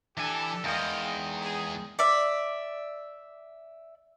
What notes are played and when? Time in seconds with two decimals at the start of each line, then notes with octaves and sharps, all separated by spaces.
0.17 E3 D4 G4 A4 G#5 A5
0.64 E2 D#3 G#3 D#5 F5 G5
1.40 G#4
1.99 D5 E5